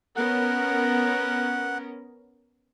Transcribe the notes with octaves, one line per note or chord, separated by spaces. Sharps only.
B3 C#4 A#4 F#5